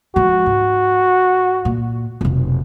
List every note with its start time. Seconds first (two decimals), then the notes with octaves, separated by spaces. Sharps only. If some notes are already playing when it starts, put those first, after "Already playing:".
0.16 F3 G#3 F#4
0.46 G#2
1.65 A#2
2.21 F1 B1